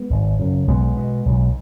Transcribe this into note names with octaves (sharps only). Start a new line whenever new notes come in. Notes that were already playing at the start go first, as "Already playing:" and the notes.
Already playing: G#3 B3
G#1
F#2 C#3
B1 G#3 B3
B2
B1